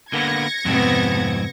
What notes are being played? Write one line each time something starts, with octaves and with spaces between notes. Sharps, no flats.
D3 A#3 B3 G#6 A#6 C#7
F2 G#2 C3 B3 C4